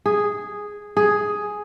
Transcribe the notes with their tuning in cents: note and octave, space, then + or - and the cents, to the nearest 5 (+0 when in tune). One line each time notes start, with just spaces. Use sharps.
G#4 -5
G#4 +5